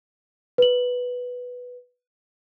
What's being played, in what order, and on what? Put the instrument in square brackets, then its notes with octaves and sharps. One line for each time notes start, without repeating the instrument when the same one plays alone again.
[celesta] B4 F#7